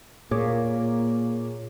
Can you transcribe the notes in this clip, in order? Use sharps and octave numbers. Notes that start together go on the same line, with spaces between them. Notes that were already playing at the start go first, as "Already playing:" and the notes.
A#2 A#3 G#4 C#5 D6